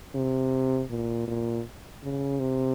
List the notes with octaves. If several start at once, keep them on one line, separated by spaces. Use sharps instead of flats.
C3
A#2
A#2
C#3
C3